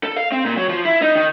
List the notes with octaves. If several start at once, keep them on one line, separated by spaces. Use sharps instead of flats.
A4
F5
C4
A#2
F#3
F3
E4
D#4
D#3